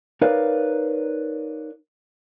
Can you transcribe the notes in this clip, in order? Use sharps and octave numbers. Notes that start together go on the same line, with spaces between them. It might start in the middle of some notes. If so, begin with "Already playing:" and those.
D#4 A#4 B4 C#5 D5 F5